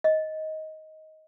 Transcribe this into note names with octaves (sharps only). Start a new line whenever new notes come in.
D#5